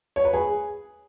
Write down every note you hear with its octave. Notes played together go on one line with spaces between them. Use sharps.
C#5
B4
G#4